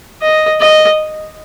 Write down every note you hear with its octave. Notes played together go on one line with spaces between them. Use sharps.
D#5
D#5